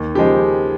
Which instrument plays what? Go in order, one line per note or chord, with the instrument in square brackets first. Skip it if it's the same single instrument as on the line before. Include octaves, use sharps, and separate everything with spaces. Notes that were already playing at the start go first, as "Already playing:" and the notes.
Already playing: [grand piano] D#2
C#3 F3 G#3 G4